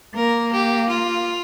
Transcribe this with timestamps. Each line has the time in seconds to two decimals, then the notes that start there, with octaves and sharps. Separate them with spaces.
0.16 A#3 A#4
0.52 G4
0.89 F4